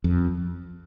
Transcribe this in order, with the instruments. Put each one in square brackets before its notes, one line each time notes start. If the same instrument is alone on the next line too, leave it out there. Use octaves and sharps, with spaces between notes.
[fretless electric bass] F2